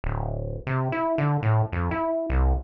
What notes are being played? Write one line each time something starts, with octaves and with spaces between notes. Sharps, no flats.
D1
C3
E4
D3
A2
F2
E4
C2